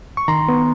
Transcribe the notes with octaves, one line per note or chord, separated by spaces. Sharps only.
C#6
D#3 A#5 C6
B3